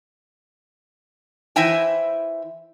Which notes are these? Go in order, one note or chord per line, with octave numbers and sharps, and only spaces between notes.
E3 E4 C5 E5 G5 G#5